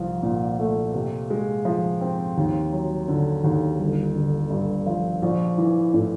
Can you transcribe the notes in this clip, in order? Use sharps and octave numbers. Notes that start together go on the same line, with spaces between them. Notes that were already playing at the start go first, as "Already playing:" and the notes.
Already playing: C2 F3
A#2
A3
C3
G#3
F3
C4
D#2
F#3
D3
D#2
G1
D3
G2
F3
A#1
E3
A2